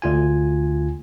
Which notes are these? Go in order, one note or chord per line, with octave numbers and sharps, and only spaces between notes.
D2 F4 G#5